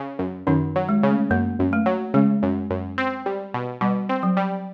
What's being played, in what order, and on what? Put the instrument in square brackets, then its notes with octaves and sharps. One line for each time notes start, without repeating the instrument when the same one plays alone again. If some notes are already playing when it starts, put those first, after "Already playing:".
Already playing: [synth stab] C#3
F#2
[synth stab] F#2 [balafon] D#3 D#4
[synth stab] F#3
[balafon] G#3
[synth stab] C#3
[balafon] A3
[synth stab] F#2 [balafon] A#3
[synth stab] F#2
[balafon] A3
[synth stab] F#3
[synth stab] C#3 [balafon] G#3
[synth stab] F#2
F#2
C4
G3
B2
[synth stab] B2 [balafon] G3
[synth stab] C4
[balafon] F#3
[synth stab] G3